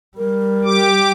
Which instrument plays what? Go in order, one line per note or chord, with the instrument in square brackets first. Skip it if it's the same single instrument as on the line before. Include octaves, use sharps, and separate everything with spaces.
[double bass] G3 [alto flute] A#4
[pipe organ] G4 D6